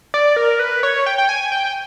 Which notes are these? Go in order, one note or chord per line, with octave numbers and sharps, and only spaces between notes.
D5
A#4
B4
C#5
G5
G5
G#5
G5